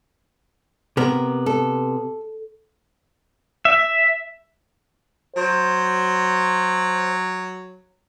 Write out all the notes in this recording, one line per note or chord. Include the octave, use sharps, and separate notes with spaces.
C3 B3 A#4
A4
E5
F#3 C5